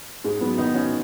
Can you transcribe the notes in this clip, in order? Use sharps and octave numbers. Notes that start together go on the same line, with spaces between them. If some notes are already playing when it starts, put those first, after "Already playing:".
G#2 G#3
F#3 B3
D#3 B3 D#4
C#4 F#4